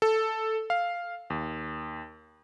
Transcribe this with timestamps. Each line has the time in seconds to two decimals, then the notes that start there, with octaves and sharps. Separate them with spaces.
0.02 A4
0.70 F5
1.30 D#2